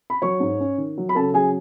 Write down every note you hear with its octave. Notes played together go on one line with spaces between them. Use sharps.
B5
F#3 C#5 C#6
G#2
C#4
D#3
F#3
B5
C#3 A4 A5
F#3 G#4 G#5